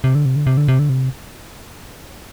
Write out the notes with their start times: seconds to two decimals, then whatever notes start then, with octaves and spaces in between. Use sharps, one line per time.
0.04 C3
0.15 D3
0.25 C3
0.36 D3
0.47 C3
0.57 D3
0.68 C3
0.79 D3
0.89 C3